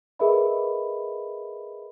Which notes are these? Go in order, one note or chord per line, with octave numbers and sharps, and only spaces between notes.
G#4 A#4 B4 D#5 E5 B5